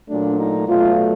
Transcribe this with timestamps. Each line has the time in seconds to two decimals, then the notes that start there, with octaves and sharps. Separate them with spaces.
0.09 A#2 F#3 A3 D4
0.39 D#4
0.68 B2 F#3 A3 F4